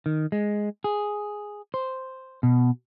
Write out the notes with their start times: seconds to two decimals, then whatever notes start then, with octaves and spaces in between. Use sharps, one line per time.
0.06 D#3
0.32 G#3
0.84 G#4
1.74 C5
2.43 B2